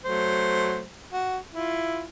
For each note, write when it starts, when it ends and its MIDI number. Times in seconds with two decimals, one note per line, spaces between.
0.04 0.85 54
0.04 0.85 57
0.04 0.85 72
1.13 1.38 66
1.54 2.05 64
1.54 2.05 65